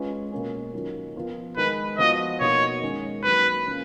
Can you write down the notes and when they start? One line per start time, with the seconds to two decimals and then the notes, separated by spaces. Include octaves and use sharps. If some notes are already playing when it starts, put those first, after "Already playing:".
Already playing: G#3 C#4 F4 B4
0.32 B2 A#3 C#4
0.73 D#3 F#3 A#3 C#4 F4
1.15 F3 B3 F4 A#4
1.57 D#3 G#3 D#4 A#4 B4
1.98 F3 B3 F#4 D#5
2.40 B2 A#3 D#4 F#4 C#5
2.82 D#3 G#3 C#4
3.23 D#3 F#3 A#3 B4
3.66 C#3 F3 A#3 C#4